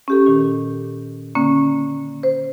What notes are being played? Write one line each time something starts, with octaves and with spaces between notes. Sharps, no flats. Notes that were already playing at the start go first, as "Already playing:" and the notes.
C#4 G4 A4
A#2 D#3
D3 A#3 C#4
C5